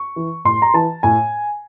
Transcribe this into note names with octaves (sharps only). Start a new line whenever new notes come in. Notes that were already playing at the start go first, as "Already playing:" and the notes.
Already playing: C#6
E3
A2 C6
A#5
E3 A5
A2 G#5